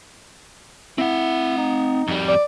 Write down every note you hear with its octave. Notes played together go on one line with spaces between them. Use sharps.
C4 E4 F#5
D#4
F2 G3
D5